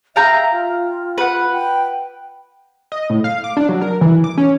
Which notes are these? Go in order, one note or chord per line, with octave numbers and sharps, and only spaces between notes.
E5 F5 G5 A#5
F4
B4 F#5
G5
D#5
A2
F5
D6
D4
F#3
A#4
E3
D6
C#4